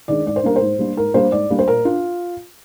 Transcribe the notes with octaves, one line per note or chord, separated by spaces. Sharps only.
D#3 G#3 D4 D5
G#2 D5
C5
G3 A#3 D4 A#4
C5
G#2
G3 A#3 D4
G#2 A#4
G3 A#3 D4 C5
G#2 D5
G3 A#3 D4
C5
A#2 A#4
D4 F4